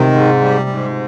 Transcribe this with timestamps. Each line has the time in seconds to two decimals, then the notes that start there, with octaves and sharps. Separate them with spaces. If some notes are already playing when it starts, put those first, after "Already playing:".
Already playing: C3 D#3
0.12 G#2
0.41 G3
0.69 G#2